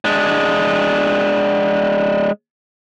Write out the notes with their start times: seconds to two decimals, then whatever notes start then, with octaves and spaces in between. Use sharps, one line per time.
0.05 G#3 D4